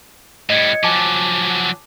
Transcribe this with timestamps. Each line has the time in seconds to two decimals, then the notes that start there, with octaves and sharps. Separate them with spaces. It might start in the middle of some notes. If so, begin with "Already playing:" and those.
0.50 A2 G3 D#5 G#6 C#7
0.83 F3 F#3 G#5 A5 D6